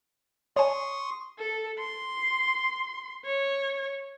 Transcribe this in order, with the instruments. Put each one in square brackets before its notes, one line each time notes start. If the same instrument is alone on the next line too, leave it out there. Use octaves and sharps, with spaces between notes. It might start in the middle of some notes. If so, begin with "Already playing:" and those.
[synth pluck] C#5 G#5 [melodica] C6 C#6 D#6
[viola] A4
C6
C#5